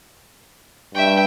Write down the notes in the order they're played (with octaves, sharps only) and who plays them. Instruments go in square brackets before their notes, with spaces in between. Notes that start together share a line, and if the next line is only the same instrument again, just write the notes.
[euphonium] G2 [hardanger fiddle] E5 G5